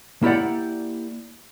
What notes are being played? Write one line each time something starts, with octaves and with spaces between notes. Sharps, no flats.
A#3 E4 G4 D5 F#5